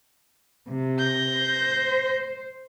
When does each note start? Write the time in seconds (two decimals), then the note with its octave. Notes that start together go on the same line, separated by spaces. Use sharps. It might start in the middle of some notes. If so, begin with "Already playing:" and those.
0.69 C3
0.99 G6 A#6
1.38 C5